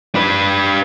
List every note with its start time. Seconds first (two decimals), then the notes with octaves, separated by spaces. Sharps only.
0.15 D4 B4